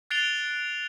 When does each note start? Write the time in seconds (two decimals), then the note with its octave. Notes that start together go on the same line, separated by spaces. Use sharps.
0.10 F#6 A6 C7 D7 F7 G7